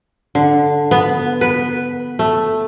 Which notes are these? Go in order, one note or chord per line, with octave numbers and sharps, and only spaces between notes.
D3
B3
B4
A3